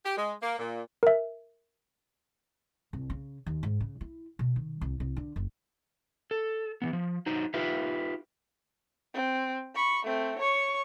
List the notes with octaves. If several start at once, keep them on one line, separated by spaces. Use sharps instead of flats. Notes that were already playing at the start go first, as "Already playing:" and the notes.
G4
G#3
A#3
A#2
A#4 E5
C2
C#3
D#2
G#2
C#3
E4
B2
D#3
C2
C2
D3
F#1
A4
E3 F3 B3
F3
F#3 D#4 C5
D#4 F4 G4 B4 E5
C4
B5 C#6
A3 C4
C#5 C#6